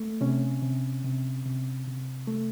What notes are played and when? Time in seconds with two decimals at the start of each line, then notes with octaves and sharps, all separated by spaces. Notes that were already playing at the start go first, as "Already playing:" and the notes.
Already playing: A3
0.21 C3 C#4
0.62 C3
1.04 C3
1.45 C3
1.87 C3
2.28 A3